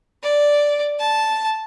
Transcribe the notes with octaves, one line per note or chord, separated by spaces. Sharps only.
D5
A5